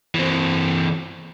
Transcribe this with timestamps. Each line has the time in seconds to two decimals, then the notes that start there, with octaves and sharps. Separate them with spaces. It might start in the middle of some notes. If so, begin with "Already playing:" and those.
0.15 E3 C4